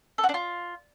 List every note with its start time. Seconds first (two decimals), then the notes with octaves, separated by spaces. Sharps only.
0.18 A4
0.24 F#4
0.29 D4
0.34 F4